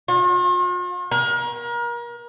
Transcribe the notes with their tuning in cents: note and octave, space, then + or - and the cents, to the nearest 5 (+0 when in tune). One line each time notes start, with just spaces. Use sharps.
F4 +45
A#4 +35